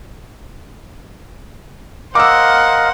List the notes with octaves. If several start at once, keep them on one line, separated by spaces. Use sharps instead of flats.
A#4 C5 D#5 F5 F#5 D6 E6